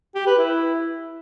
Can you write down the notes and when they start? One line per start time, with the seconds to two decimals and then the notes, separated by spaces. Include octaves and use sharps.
0.15 G4
0.27 B4
0.38 E4